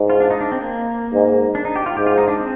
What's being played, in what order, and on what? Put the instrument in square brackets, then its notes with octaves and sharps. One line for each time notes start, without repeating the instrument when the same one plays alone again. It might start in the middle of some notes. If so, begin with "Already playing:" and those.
Already playing: [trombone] G#2
[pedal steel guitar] F4
D4
D#4
D4
C4
A#3
[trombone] G#2
[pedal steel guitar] D4
D#4
G4
F4
[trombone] G#2 [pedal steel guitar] G4
[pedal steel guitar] F4
D#4
D4
C4